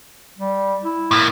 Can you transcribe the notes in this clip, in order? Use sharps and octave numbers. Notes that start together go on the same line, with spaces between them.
G3
E4
A2 A#3